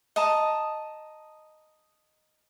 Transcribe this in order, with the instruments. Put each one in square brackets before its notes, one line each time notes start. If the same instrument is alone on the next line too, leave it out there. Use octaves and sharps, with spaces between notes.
[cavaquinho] D#5 A5 A#5